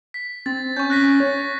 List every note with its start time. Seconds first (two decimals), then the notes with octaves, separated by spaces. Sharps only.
0.14 B6
0.46 C4 A6
0.77 C#4 C#6 G6
0.90 F#6 A#6 B6
1.20 C#5